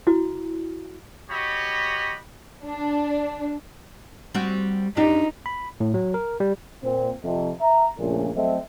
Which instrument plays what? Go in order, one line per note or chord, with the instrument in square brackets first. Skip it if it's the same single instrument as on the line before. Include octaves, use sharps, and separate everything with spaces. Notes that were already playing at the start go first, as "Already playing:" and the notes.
[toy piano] E4 F#4
[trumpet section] F#4 G4 C#5 D#5 B5
[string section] D4
[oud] G3 C4 F#4
[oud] F#2 D4 G4 [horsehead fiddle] D#4
[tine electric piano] B5
A2
F#3
A#4
G3
[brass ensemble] A#2 C4
F2 C3
E5 A#5
A#1 A#2 C#3 A3
F#3 A3 C4 A4 D#5 E5